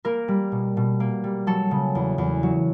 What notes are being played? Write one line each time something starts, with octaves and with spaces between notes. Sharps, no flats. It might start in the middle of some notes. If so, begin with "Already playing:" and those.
A#3 A#4
G3
B2
B2
A#3
G3
F#3 A4
C#3
E2
E2
F#3